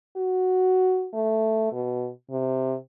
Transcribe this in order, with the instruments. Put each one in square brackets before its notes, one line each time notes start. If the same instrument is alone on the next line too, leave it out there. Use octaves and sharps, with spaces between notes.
[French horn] F#4
A3
B2
C3